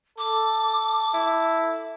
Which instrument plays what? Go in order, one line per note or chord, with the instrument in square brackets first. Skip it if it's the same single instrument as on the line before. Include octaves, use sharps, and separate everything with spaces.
[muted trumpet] A4 [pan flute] D6
[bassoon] E4